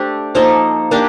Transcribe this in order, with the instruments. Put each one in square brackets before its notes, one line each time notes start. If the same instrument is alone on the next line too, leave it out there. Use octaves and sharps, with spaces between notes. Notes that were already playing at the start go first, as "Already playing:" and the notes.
Already playing: [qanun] A3 D4 G4 [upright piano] C5
[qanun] F3 A#3 D#4 A4 [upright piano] C5
[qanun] A#3 D4 G4 [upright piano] A#4